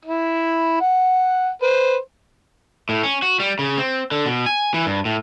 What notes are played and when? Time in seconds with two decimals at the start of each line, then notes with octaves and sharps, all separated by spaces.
0.05 E4
0.81 F#5
1.62 B4 C5
2.89 A2
3.03 C#4
3.22 F#4
3.40 G3
3.59 C#3
3.78 C4
4.11 D3
4.26 B2
4.46 G#5
4.74 E3
4.86 G2
5.05 A2